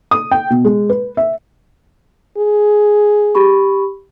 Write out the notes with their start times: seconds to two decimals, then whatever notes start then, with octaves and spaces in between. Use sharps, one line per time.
0.11 D#6
0.31 G5
0.50 B2
0.65 G#3
0.89 B4
1.17 E5
2.38 G#4
3.35 G4 B5 C#6